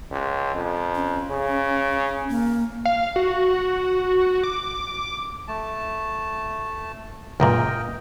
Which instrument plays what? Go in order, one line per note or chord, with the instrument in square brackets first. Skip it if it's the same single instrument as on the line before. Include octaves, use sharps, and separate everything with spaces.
[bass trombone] C#2
F2
[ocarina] C#4
[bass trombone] C#3
[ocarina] A#3
[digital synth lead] F5
F#4
D6
[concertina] A3 A5
[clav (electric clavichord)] C#2 F#2 A#2 [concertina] A#4 D#5 G5